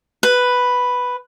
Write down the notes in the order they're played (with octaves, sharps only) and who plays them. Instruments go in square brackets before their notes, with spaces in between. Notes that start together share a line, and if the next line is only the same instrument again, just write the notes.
[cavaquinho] B4